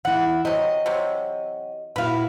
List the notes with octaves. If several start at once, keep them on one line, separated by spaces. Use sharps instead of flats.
E3 E4 F#5
C3 F#3 D#5
C3 F#3
A#2 E4 F#4 B4 F5